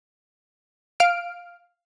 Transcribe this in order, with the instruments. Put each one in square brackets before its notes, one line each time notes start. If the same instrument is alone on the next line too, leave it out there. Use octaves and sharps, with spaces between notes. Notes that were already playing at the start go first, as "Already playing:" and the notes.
[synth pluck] F5 F6 D7